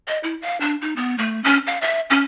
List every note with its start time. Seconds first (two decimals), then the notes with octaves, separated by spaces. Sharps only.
0.08 D#5
0.23 E4
0.42 F5
0.61 D4
0.82 D#4
0.96 B3
1.18 A3
1.44 C#4
1.67 F5
1.82 E5
2.10 C#4